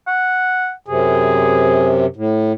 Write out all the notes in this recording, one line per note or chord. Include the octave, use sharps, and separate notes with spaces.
F#5
F#2 C3 G#4
A2